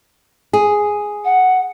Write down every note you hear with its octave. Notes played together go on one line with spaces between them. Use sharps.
G#4
F#5